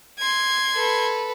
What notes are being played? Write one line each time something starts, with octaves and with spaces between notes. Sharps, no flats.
C6 G#6
A4 B4